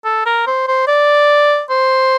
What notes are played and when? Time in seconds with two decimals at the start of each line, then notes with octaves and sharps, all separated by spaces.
0.05 A4
0.26 A#4
0.47 C5
0.68 C5
0.87 D5
1.70 C5